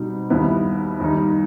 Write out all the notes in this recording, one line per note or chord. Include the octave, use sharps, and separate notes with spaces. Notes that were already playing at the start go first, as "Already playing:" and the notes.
Already playing: B2 G3 C4 D#4
D#2 D#3 G3 B3 E4
D#2 D#3 G3 D#4